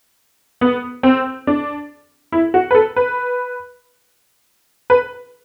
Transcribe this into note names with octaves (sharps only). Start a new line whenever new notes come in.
B3
C4
D4
E4
F#4
B4
A4
B4
B4